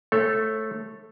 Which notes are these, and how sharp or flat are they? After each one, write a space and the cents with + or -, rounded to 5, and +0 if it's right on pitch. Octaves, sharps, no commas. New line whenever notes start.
A3 +0 A4 +0 C#5 -30